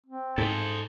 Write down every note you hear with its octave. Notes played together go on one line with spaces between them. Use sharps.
C4
G#2 A4 C5